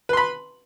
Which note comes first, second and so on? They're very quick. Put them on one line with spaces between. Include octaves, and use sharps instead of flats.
B4 C6 B5